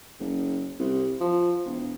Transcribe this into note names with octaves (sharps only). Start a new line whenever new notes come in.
F#1
C2
F3
E1